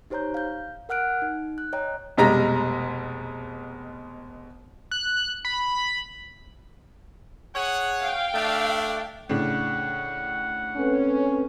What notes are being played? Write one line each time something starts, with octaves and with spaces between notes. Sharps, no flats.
D#4 G4 C5 C#5 A#5 G6
F5 G6
A#4 F#5 F6 F#6 D7
D#4
F#6
C#5 D#5 G5 A#5
F1 B2 G3 G#3 A#5 A#6
F#6
B5
G#4 C#5 F#5
F5 G5
A3 D4
A2 C#3 D4 F#5
C4 C#4 A4 B4